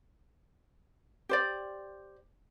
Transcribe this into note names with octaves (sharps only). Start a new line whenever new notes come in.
G4 C5 D5